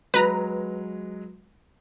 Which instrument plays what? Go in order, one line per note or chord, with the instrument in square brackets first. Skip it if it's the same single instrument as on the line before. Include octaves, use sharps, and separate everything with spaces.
[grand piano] F#3 G#3 [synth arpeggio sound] B4 A#5